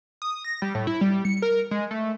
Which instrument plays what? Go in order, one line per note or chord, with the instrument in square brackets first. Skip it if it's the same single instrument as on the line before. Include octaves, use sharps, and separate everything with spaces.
[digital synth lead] D#6
A#6
G3
A2
E4
G3
C#7
A#4
G#3
A3